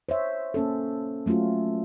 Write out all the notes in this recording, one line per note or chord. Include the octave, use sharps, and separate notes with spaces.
C5 C#5 E5
A#3 C#4 A4
F#3 A3 C#4 F4 F#4